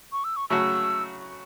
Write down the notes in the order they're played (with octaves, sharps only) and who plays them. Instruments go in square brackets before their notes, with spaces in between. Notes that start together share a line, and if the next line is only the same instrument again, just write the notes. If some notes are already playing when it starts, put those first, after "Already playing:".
[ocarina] C#6
E6
C#6
[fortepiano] C#3 F#3 A3 F#4 [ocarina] E6